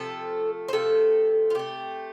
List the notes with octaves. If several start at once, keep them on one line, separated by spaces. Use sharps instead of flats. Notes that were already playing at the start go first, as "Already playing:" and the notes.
Already playing: C3 F3 A3 A4
C5
C3 F3 A3 A4
F4
C3 A3 G4